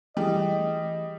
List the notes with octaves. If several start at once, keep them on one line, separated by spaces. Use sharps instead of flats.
E3 G3 A3 G#4 D#5 G5